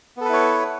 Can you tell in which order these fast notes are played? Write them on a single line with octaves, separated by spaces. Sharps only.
B3 A4 B4 E4 C#5